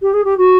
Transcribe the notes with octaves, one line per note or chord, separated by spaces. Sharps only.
G4
G#4
G4
F#4